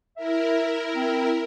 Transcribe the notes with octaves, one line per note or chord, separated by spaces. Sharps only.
E4 A#4 E5
C4